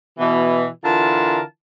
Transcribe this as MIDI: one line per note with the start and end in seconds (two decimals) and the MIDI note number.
0.18 0.66 47
0.18 0.66 52
0.85 1.40 50
0.85 1.40 52
0.85 1.40 65
0.85 1.40 70
0.85 1.40 81